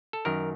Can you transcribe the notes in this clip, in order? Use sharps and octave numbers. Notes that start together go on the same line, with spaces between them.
A4
F#2 D#3 A#4